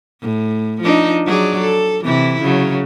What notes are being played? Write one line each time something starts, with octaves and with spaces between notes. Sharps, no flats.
A2
F3 D4 D#4
F#3 G#4 D5
A4
C3 E3 E4
C#3 F#3